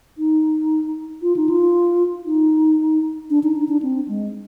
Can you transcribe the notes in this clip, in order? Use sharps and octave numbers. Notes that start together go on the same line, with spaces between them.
D#4
F4
D#4
F4
D#4
D4
D#4
D#4
D4
C4
G#3